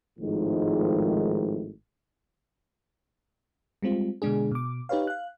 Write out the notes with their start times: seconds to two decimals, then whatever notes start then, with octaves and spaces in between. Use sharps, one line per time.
0.19 G#1 A2 D#3 F3 G#3
3.82 G3 G#3 C4 F4
4.22 B2 D3 G#3 D4 G#4
4.51 B2 D6
4.89 D#4 G4 B4 C#5 F5
5.07 F5 F#6